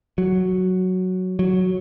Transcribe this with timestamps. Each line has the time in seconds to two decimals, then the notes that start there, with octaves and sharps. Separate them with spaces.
0.18 F#3
1.39 F#3